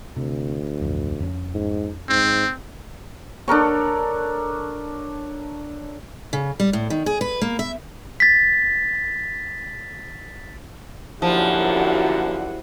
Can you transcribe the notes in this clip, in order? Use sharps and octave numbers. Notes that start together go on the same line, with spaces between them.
D2 C3
D1 B1 F2
F2 C#4
G#2
G#2 C4
D4 A4 A#4 C#5
C#3
G3
A2
D#3
G#4
B4
A#3
E5
A6 B6
F#2 A#2 D3 F3 E4 F#4 G4 F#5